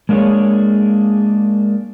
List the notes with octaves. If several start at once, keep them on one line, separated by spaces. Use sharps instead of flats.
G#3 A#3 D4 G#4 C#5